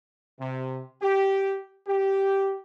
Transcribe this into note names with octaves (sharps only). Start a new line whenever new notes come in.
C3
G4
G4